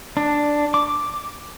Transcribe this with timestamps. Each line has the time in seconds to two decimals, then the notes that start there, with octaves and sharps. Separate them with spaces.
0.17 D4
0.74 D6